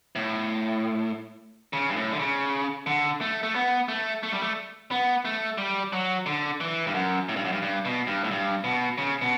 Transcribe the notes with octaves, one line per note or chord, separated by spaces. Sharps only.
A2
C#3
G2
A2
D3
C#3
D3
A3
A3
B3
A3
A3
G3
A3
B3
A3
G3
F#3
D3
E3
G2
F#2
A2
G2
F#2
G2
G2
B2
G2
A2
G2
B2
C#3
B2